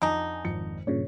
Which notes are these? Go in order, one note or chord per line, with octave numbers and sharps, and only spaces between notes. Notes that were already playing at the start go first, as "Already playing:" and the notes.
F2 D3 D#4 G#5
G#1 F2 C#7
G2 A#2 C#3 C#5